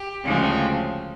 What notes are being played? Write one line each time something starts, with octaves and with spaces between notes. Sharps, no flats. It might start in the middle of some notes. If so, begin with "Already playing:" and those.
Already playing: G4
D2 C#3 F3 G#3 C4